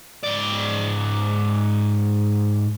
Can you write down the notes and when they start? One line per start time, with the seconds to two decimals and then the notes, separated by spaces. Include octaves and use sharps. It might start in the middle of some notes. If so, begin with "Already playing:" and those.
0.24 G#2 D5